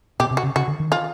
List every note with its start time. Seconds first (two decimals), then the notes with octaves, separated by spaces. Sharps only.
0.20 B2 G4
0.31 C3
0.37 F#4
0.43 C#3
0.56 C#3 F#4
0.68 D3
0.80 D#3
0.92 F4